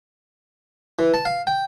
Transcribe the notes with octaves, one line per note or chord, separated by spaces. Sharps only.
E3
A5
F5
G5